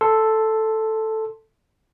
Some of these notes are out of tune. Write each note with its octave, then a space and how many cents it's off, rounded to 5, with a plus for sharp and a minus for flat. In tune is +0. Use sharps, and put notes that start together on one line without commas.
A4 +0 C6 +0